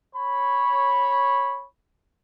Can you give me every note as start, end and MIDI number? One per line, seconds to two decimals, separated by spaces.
0.16 1.65 73
0.16 1.65 83